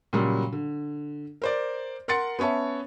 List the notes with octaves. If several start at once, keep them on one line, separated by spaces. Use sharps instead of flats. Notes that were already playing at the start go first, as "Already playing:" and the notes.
A#2 C#3 F#3 G3
D3
A#4 C5 D5
A#4 F#5 C6 A6 C#7
B3 C#4 C#5 E5 A5